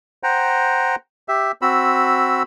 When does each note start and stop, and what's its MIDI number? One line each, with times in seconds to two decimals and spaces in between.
0.23 0.96 72
0.23 0.96 78
0.23 0.96 79
0.23 0.96 82
1.28 1.52 67
1.28 1.52 76
1.62 2.43 60
1.62 2.43 66
1.62 2.43 83
1.62 2.43 88